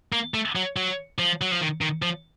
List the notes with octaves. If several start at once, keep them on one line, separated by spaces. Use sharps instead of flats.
A#3
A3
F#3
F#3
F3
F#3
F3
D#3
D#3
F3